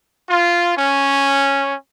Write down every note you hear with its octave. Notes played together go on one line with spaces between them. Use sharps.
F4
C#4